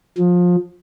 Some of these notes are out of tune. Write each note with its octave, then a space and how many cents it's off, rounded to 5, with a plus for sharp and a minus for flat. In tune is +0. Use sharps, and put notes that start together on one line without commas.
F3 +25